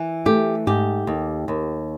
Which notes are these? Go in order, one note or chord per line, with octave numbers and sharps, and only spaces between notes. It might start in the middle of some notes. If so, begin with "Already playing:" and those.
Already playing: E3
A3 G4
G#2 G4
D#2
D#2